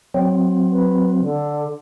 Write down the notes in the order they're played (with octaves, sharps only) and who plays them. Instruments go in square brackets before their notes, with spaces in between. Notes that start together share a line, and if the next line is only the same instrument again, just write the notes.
[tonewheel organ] F#3 C4
[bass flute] B4
D3